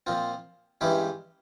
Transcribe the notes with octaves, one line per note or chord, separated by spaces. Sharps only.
A#2 F3 C4 F4
G2 E3 G#3 C#4 E4 G4